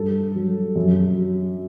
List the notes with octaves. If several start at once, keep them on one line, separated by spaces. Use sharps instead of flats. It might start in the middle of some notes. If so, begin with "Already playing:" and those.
Already playing: G2 A4
F#3
F#2
F#3